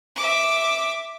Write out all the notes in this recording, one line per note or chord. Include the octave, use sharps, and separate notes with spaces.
E5 D6